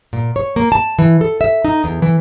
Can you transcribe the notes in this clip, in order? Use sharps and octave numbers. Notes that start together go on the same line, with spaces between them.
A#2
C#5
A#3
A5
E3
A4
E5
D#4
E2
E3